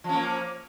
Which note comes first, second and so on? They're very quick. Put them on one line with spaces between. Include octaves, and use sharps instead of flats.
F3 C#4 A#3